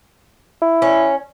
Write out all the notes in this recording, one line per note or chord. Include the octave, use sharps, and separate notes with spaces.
E4
C#4